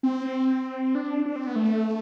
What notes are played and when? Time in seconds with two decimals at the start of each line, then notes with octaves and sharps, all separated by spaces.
0.03 C4
0.95 D4
1.26 D4
1.36 C4
1.47 B3
1.56 A3